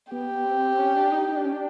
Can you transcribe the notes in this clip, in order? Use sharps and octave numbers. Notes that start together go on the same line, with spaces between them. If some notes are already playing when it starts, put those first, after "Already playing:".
B3 G4
B3
C4
C#4
D4
D#4
D#4
D4
C#4
D4